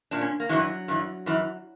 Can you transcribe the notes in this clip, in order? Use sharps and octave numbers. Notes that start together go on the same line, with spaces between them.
A#2 D4
C#4
A#3
G2 E3 F#3
G2 E3
F#2 E3